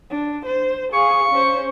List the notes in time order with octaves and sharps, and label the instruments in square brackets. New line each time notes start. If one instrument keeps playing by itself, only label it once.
[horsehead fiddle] D4
C5
[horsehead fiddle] G#4 F5 [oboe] C#6
[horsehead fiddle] C#4 C5